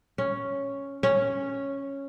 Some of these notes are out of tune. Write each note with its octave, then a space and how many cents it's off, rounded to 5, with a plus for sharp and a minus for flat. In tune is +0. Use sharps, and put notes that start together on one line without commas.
C#4 +0
C#4 -5